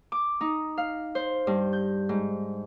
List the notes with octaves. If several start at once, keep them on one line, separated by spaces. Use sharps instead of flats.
D6
D#4
F5
C5
G2
G6
G#2